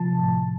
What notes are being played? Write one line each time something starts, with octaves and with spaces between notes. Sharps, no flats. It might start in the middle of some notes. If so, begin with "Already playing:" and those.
Already playing: C3 F3 A5
A2